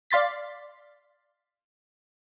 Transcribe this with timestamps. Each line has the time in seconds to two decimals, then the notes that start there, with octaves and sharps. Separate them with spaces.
0.11 D5 F5 C6 A6 B6